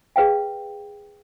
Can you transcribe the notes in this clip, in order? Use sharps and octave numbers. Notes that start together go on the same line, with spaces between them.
G#4 B4 F5 G5